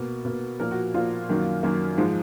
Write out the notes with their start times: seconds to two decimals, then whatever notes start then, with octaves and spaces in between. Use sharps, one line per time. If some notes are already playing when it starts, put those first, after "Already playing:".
Already playing: B2 A#3
0.25 B2 A#3
0.60 A#2 F3 A#3 A#4
0.71 F#4
0.94 A#2 F3 A#3 F4
1.29 F#2 D#3 F#3 A#3
1.63 F#2 D#3 F#3 A#3
1.98 G#2 F3 G#3